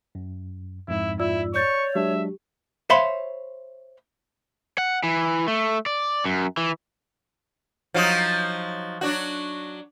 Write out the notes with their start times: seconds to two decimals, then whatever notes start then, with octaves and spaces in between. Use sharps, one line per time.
0.15 F#2
0.88 F2 G#2 E4
1.20 E4 F4 D5 E6
1.54 C#5 D5 C#6 G6 A6
1.95 F#3 G#3 D4 G4 E5
2.90 C5 C#5 E5 F5 B5 C6
4.78 F#5
5.04 E3
5.48 A3
5.86 D5
6.26 F#2
6.57 E3
7.94 F3 F#3 D#4
9.01 F#3 D4 F#4